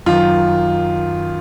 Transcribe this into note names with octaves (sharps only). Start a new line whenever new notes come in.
F#2 D#3 F4